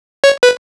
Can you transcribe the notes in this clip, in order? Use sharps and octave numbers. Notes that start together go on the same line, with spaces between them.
C#5
B4